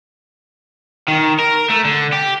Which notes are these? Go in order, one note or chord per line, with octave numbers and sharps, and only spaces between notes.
D#3
A#4
A3
D3
G4